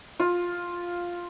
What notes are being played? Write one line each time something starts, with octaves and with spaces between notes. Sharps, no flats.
F4